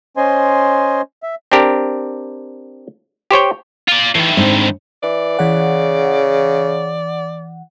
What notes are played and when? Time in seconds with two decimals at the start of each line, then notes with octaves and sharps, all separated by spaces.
0.17 C#4 C5 D#5 G#5 C6
1.23 E5
1.52 C4 D4 G4 A#4
3.31 G4 C5 C#5 G5
3.88 F4 D5
4.15 A2 D#3 E3
4.37 G#2 C4 D4
5.03 E3 D5
5.39 C#3 E3 F#5